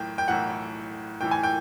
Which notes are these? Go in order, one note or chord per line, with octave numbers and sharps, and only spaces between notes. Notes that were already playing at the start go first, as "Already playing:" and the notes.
Already playing: B1 A2 E3 G5
G5
B1 A2 E3 F#5
B1 A2 E3 G5
G#5
G5